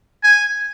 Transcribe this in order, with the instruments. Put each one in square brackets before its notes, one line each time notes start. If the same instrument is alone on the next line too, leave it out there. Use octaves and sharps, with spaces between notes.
[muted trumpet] G#5